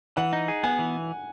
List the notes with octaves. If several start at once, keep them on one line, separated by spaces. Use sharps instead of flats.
E3 F#5
D#4
G#4
B3 G#5
E3